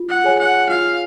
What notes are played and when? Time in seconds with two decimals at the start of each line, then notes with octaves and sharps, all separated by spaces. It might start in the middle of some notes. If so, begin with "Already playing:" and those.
Already playing: F4
0.09 F#5
0.24 G#4 C#5 G#5
0.39 F#5
0.69 F4 F5